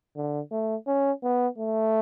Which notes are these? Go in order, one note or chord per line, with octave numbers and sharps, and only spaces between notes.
D3
A3
C#4
B3
A3